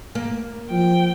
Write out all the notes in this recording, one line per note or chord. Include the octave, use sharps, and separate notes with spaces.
A#3
F3 G5